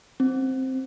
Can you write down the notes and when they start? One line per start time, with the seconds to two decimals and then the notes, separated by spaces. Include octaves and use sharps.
0.20 C4